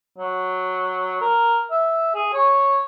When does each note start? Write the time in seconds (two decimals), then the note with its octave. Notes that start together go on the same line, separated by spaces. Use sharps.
0.18 F#3
1.21 A#4
1.71 E5
2.15 G#4
2.33 C#5